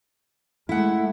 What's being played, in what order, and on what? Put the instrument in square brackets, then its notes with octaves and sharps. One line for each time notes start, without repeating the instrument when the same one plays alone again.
[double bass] G#3 A3 [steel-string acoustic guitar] E4 F#5